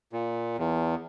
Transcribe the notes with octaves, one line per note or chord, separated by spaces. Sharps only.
A#2
E2